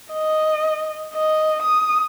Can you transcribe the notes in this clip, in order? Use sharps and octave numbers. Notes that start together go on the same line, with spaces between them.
D#5
D#5
D#6